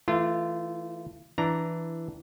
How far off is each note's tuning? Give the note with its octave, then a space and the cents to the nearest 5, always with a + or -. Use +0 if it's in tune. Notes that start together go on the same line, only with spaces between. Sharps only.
E3 +0 A3 +0 F4 -25
E3 +0 D4 +0 A#5 +0